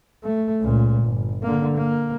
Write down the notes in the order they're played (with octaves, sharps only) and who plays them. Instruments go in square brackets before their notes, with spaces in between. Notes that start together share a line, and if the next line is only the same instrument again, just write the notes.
[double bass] A3
C#2 A#2
G1
D3 A#3
A#3